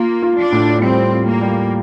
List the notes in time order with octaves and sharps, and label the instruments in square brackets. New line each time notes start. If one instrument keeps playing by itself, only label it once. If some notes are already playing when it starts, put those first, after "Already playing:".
Already playing: [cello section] A#3 [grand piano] F4
[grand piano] F4
[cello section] D4
[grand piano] A2
[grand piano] G3 [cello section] C4
[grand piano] F4
[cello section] A#3
[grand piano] G3